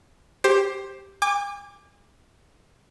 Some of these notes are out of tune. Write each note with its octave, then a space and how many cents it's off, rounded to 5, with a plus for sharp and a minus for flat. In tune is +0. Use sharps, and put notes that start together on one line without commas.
G4 +0 C5 +15
G#5 -40 D6 +0